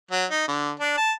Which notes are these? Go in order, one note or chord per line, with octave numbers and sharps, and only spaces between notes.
F#3
D#4
D3
D4
A5